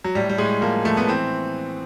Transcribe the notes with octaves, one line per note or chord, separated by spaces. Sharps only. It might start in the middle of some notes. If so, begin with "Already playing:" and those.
F#3
A2 G3
G3
A2 G#3
F3 A#3
F3 A3
B3
E3 C4